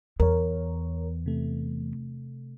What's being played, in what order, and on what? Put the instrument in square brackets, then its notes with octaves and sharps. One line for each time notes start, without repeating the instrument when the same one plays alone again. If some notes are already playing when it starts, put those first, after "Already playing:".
[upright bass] E2 [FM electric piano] A#4 C#5
[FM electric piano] C3 A3